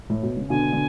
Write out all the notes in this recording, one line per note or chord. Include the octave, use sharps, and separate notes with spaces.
A2
B2
C#3
B2 D3 G#5
D3